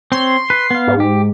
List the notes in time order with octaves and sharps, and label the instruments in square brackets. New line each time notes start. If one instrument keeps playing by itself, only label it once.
[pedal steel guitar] C4 C#5 [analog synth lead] C6
[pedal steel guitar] B4
B3 F5
[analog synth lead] G#2
[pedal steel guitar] G4